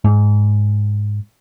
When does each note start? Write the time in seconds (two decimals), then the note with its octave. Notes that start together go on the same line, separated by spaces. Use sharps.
0.04 G#2